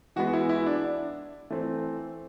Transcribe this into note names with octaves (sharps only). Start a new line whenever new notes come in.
E3 G#3 B3 F#4
E4
E4
D4
E3 A3 C4